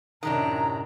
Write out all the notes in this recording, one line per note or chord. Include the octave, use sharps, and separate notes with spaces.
F#2 A2 C3 D#3 G#3 D4 A#5